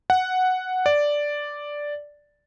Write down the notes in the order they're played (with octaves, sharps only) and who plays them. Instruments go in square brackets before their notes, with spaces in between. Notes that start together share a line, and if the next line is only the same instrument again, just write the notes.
[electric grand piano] F#5
D5